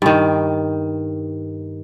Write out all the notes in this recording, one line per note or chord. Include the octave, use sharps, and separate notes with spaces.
G2 D#3